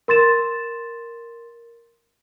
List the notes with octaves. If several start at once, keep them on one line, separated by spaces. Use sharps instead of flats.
A#4 C6 A6 E7